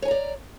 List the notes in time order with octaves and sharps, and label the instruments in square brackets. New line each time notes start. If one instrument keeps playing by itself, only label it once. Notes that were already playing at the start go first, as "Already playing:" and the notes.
[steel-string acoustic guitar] C#5
G#5
A#5
D5